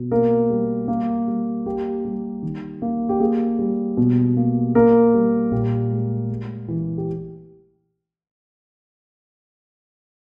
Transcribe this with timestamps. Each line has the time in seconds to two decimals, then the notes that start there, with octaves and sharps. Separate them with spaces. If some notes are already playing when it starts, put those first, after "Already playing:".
Already playing: B2
0.11 A#3 A#4
0.50 G3
0.88 A#3
1.28 G3
1.66 A#3 G4
2.05 G3
2.42 D#3
2.82 A#3
3.09 G4
3.20 A#3 G#4
3.59 G3
3.97 B2
4.37 A#3
4.75 A#3 A#4
5.14 G3
5.52 A#2 G4
5.91 G#3
6.29 G#3
6.68 E3
6.98 G4